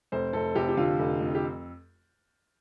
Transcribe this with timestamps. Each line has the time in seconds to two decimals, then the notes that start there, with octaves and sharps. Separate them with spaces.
0.12 F1 C5
0.33 F1 A4
0.55 F1 G4
0.69 G4
0.77 D3 F4
0.99 F1
1.21 F2
1.35 G4